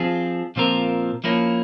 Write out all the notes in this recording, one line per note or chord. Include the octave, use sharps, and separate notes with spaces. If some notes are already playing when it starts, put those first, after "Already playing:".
Already playing: F3 C4 F4 G#4
A#2 F3 C4 F4 A#4
F3 A#3 C#4 E4